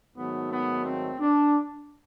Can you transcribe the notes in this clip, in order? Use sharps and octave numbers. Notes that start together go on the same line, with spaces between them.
G#2 D#3 F#3 A3 B3
B3
C4
D4